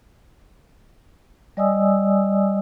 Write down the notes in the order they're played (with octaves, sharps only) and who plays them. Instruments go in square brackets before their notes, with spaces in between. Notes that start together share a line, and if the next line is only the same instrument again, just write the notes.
[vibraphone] G3 D5 D#5 G#5 D#6 E6